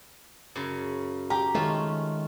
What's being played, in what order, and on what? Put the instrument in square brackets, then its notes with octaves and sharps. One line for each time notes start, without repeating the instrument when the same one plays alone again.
[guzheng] F#2 C#3
[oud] G4 [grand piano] A#5
[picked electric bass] D#3 G#3 [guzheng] A3 C#4 F4